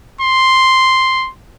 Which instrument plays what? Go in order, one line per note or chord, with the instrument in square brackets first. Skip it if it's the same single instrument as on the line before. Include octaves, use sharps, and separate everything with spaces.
[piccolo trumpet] C6